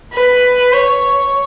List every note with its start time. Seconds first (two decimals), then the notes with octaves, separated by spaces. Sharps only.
0.14 B4
0.74 C#5